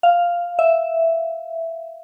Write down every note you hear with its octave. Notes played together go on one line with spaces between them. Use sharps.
F5
E5